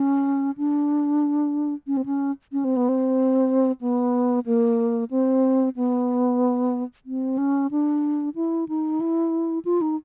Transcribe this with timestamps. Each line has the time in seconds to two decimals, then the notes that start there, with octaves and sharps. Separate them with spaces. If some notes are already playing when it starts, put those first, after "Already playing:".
Already playing: C#4
0.57 D4
1.87 C#4
1.97 C4
2.06 C#4
2.52 C#4
2.64 C4
2.77 B3
2.89 C4
3.81 B3
4.46 A#3
5.11 C4
5.77 B3
7.06 C4
7.38 C#4
7.71 D4
8.35 E4
8.69 D#4
9.01 E4
9.65 F4
9.81 D#4